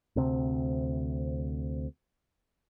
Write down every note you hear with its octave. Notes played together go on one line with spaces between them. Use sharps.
D2 C3 C4